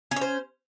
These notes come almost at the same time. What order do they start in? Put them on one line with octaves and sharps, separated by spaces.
C#4 C#5 C5